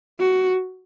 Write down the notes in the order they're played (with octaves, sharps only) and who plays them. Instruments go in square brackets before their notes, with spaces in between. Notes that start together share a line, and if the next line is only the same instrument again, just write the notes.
[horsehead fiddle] F#4